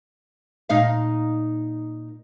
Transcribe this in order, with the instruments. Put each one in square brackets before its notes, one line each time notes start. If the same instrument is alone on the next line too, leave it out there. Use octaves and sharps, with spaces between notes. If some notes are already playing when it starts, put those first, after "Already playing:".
[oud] A#2 D#4 F5